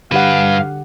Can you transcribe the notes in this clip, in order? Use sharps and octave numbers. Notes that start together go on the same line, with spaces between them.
G2 D3 G4 B4 F5 F#5